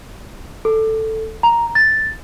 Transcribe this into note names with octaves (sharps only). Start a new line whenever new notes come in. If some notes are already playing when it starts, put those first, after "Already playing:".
A4
A#5
A6